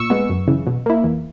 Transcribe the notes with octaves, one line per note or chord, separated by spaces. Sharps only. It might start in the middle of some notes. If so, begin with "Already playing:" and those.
Already playing: A#2 C#6 E6
G#3 B3
F#2
C#3 E3
B2
A#3 E4
E2